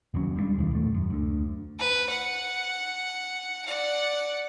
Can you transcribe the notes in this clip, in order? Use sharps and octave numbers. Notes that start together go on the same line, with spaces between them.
F#1 D#2 F#3 C#4
G3 G#3 B3 D4
E1 D2 D#3 E3
D#1 E2 A3
F#2
D2 D3
B4
F#5
D5 F#5